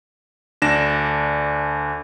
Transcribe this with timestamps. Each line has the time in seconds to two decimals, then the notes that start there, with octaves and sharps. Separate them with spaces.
0.62 D2 D4 A#6 E7